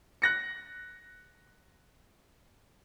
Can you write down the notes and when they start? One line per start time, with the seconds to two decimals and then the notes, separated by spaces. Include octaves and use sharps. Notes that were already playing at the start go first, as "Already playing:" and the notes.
0.22 F#6 A#6 C#7